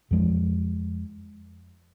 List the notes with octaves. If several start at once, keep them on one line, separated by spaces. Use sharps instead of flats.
F2 F3 G#3